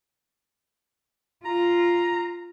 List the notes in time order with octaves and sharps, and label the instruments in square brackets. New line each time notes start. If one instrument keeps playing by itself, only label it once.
[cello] F4 [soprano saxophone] A#5